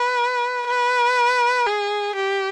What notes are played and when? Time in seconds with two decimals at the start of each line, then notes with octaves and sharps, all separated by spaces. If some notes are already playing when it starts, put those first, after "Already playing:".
Already playing: B4
0.67 B4
1.66 G#4
2.16 G4